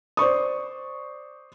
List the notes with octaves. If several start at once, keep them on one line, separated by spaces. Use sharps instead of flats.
C5 D5 C#6 D#6